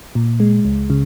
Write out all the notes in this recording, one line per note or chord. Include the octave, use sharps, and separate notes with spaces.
A#2
G#3
C#2
C#3